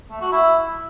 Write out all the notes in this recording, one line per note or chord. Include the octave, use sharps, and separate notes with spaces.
A3
F#4
E4